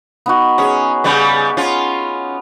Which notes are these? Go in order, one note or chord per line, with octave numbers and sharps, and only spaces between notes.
B3 D#4 F#4
C#4 G#4
C#3 G3 B3 F#4
C#4 F4